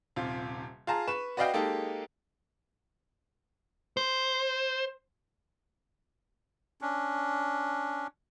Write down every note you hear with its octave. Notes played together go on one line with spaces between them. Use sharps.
D#1 C3 F4
F4 G#4 A5 A#5
B4 C#6 E7
F#4 B4 D5 D#5 F5 G5
G#3 A#3 D#4 G4 A4
C5
C#4 D4